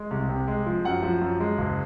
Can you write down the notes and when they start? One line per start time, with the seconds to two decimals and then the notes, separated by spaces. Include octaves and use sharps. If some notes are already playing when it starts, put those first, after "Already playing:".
Already playing: G#3
0.11 C2
0.29 C3
0.48 G#3
0.66 F3
0.85 F#2 F#5
1.03 F3
1.22 F#2
1.40 G#3
1.58 F#1